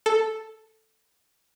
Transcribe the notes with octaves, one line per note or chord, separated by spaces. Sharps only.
A4